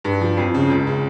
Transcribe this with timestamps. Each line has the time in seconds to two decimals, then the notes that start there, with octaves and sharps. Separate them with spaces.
0.04 G2
0.21 F3
0.37 F2
0.54 C#3
0.70 C#2
0.87 C#3